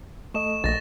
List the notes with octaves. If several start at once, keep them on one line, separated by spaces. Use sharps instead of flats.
A3 A4 D#5 C#6 E7
A#1 A6 A#6